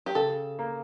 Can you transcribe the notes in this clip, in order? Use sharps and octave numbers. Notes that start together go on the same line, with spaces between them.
G4
C#3 A4
A#3